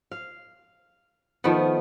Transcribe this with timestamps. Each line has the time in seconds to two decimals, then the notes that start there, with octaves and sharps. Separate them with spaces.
0.12 F5
1.44 D#3 F3 A3 B3